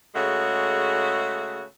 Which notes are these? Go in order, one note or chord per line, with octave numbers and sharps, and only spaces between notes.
C#3 G#3 A3 F#4